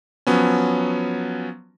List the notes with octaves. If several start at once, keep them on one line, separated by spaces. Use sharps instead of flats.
F3 F#3 B3 C#4